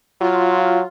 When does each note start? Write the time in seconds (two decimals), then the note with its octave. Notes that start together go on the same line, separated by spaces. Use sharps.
0.21 F#3 F4